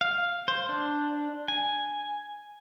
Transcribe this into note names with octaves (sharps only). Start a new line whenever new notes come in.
F5
C5
D4
G#5